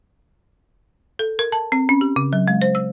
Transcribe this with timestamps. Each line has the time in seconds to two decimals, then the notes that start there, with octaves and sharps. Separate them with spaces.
1.19 A4
1.39 A#4
1.52 A5
1.72 C4
1.89 C#4
2.01 G4
2.16 C#3
2.33 F#3
2.48 G#3
2.62 C5
2.75 E6